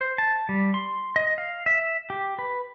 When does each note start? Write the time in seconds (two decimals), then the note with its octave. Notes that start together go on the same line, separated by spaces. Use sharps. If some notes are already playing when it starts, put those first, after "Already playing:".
0.01 C5
0.18 A5
0.49 G3
0.74 C6
1.16 D#5
1.38 F5
1.66 E5
2.10 G4
2.39 B4